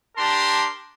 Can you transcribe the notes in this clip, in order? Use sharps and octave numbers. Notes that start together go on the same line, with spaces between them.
D4 G4 A#4 A5 C6